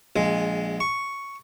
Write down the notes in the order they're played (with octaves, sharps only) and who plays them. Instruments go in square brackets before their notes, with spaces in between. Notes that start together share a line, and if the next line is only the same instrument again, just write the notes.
[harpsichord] A#1 G#3
C#6